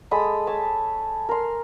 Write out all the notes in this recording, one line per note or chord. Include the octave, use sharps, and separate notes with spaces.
G#3 A4 B5 D#6
C#5 A5
A#4 C6